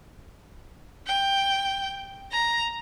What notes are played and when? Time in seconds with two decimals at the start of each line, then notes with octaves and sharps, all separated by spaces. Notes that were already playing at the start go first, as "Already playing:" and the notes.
1.07 G5
2.32 A#5